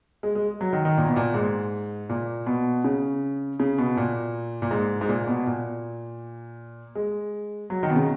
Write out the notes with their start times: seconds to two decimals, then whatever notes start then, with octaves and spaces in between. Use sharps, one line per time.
0.23 G#3
0.35 G#3
0.61 F#3
0.73 D#3
0.85 D#3
0.97 A#2
1.07 B2
1.16 A#2
1.34 G#2
2.09 A#2
2.47 B2
2.84 C#3
3.60 C#3
3.78 B2
3.97 A#2
4.62 A#2
4.71 G#2
5.01 G#2
5.09 A#2
5.28 B2
5.46 A#2
6.95 G#3
7.70 F#3
7.83 D#3
7.90 B2
7.96 C#3